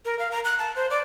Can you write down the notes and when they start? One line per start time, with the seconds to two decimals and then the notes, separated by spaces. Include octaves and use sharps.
0.05 A#4
0.19 F5
0.31 A#5
0.45 F#6
0.59 A5
0.76 C5
0.90 D5